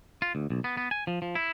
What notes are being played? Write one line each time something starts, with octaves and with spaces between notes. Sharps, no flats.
F4
D2
B1
B3
B3
G#5
F3
F3
E4